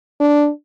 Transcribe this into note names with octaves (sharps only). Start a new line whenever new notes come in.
D4